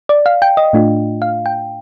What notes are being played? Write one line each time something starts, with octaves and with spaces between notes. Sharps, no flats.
D5
F5
G5
D#5
A2 A3 D4 F4
F5
G5